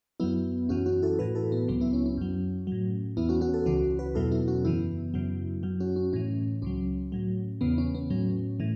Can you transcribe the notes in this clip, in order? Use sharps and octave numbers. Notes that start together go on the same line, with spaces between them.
F#2 F#3 B3 E4
F#2 E3 C#4 F#4
C#4 F#4
E4 A4
A2 E3 F#4 B4
E4 A4
B3
C#2 C#3 F#3 B3
B3 E4
C#4
C#4
F#2 F#3
A2 F#3
E2 E3 B3 E4
C#4 F#4
C#4 F#4
E4 A4
C#2 C#3 E3 C#4 F#4
F#4 B4
E2 B2 F#3 E4 A4
B3 E4
C#4 F#4
F#2 C#3 E3 B3 E4
F#2 C#3 F#3
F#2 F#3
C#4 F#4
C#4
A2 E3 C#4
C#2 C#3 F#3 C#4
A2 F#3
E2 C#3 E3 B3
C#4
B3
A2 F#3 C#4
A2 E3